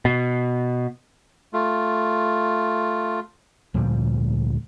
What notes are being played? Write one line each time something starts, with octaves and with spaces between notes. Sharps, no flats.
B2
A3 F4
D2 A#2 F3 G3